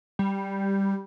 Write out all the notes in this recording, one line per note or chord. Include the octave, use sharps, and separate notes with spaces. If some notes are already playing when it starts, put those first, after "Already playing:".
G3